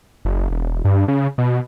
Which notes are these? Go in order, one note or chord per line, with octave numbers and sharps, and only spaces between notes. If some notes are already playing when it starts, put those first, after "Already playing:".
F#1
E1
G2
C#3
B2